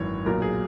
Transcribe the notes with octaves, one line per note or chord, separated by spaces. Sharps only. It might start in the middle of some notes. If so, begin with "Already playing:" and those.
Already playing: G#1 F#2 E3 C#5
B1 A#2 F#3 A#4
G#4